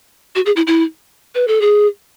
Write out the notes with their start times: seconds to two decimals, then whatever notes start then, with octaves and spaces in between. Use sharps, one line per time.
0.35 F#4
0.46 G#4
0.56 E4
0.67 E4
1.35 B4
1.48 A4
1.61 G#4